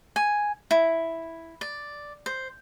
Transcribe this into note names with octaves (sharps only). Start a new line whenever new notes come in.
G#5
E4
D5
C5